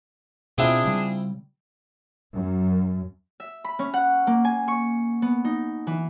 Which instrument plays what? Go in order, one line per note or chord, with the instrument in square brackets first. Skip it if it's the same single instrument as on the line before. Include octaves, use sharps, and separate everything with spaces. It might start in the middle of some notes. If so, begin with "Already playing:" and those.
[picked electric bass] B2 [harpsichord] C4 E4 F4 [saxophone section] D4 G#4
[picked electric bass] C#3 G3
[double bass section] F#2
[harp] E5
B5
C#4
F#5
A#3
G#5
C#6
B3
D#4
E3